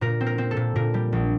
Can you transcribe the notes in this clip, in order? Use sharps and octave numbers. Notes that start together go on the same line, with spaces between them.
A#2 A#4
C4
A#4
C4
A4
A#2
A#2 A#4
G3
A#1